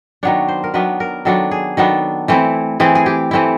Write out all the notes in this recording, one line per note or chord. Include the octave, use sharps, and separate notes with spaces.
D#3 F#3 B3 D4 C#5
C5
A#4
D#3 F#3 B3 D4 B4
A#4
D#3 F#3 B3 D4 A4
G#4
D#3 F#3 B3 D4 A4
E3 A3 C4 E4
E3 A3 C4 E4 G#4
G#4
G4
E3 A3 C4 E4